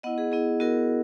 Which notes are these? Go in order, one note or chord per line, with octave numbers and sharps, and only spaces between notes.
B3 E4 D#5 F#5
G#4
B3 E4 G#4
B3 E4 F#4 A#4